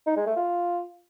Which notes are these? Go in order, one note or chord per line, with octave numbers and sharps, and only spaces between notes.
D#4
G#3
A3
F4